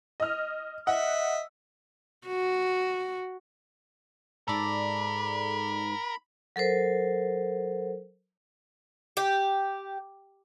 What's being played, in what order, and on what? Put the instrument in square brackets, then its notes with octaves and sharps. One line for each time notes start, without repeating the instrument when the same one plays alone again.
[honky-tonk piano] D#5 F6
[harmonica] D#5 E5 [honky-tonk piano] F#5
[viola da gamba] F#4
[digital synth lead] G#2 [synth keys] A4 D5 [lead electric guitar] A#4 [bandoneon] B5
[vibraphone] F#3 A4 A#4 C5
[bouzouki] G4